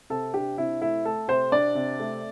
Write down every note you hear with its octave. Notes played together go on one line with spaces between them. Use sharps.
C3 A4
D4 G4
C3 E4
A3 E4
A3 A4
C3 C5
D4 D5
C3
A3